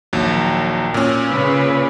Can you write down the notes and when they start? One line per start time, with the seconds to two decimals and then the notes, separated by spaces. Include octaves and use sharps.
0.13 A#1 D#2 F#3
0.94 A#2 C#4
1.30 C#3 B4